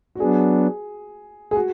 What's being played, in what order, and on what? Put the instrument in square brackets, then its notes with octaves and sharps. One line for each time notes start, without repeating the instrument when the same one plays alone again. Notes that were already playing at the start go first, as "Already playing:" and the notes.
[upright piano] F#4
[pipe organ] F#3 B3 D4 [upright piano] G#4
[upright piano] G#4
F#4